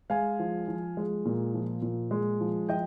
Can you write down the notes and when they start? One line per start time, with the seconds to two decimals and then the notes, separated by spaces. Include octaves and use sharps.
0.10 G#3 F5 G#5
0.39 F3
0.68 F3
0.97 G#3
1.26 A#2
1.54 F3
1.82 A#2
2.11 G#3
2.40 F3
2.69 F3 D#5 G5